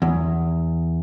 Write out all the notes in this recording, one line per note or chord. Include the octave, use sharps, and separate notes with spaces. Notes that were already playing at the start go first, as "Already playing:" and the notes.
E2